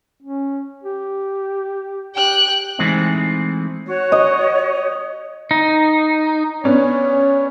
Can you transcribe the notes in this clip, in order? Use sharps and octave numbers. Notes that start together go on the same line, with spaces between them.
C#4
G4
G4 G5 F#6
E3 G#3 A3 C4 D#4
F#4 C#5
D#5
D#4
B3 C#4 D4 C#5